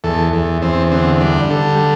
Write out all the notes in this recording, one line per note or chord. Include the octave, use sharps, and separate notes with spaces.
E2 A4
E2
E2 C4
D3 C4
G3 D4
D3 A4
G3